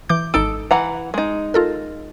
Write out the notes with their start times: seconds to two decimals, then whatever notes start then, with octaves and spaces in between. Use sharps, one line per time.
0.09 E3 D6 G6
0.34 G#1 D#4 A4 D7
0.71 E3 F#5 A#5
1.14 G#3 D#4
1.54 F4 A4 A#4